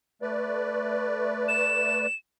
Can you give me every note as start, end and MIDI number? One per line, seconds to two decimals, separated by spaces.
0.22 2.06 57
0.22 2.06 71
0.22 2.06 74
1.48 2.15 100